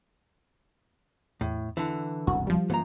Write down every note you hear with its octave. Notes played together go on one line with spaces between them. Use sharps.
E2 A2
D3 E3
E1 C2 F#2 F#4
F3 G3
F#2 E3 A#3 A#5